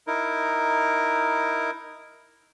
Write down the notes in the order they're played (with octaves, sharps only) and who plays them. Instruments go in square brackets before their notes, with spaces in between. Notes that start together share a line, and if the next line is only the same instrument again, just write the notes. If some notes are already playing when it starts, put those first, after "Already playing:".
[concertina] D#4 E4 A#4